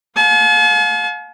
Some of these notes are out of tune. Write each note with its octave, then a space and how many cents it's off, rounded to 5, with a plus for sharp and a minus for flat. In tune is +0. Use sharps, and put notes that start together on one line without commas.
F5 +30 A5 -45